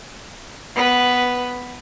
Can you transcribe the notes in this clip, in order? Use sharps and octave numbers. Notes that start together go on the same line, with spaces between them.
B3 B4